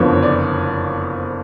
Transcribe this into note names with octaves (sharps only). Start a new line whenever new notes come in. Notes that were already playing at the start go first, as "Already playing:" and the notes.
Already playing: F#1 F2 D3 F3 B3 C#5
D5